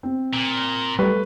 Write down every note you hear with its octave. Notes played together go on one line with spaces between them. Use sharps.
C4
A#2
G3 A3 B4 C#6